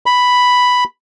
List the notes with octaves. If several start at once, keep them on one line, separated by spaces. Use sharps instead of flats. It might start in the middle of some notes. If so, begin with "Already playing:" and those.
B5